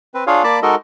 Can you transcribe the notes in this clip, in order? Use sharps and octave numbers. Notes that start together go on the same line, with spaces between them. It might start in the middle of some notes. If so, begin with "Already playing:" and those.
C4 B4
D4 F4 G#4 C#5 F5
A#3 D5 A5 B5 D6
G#3 D#4 F#4 A4 A#4 D#5